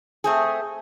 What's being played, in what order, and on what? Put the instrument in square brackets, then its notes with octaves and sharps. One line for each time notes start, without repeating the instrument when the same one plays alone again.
[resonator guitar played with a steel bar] A3 C4 G#4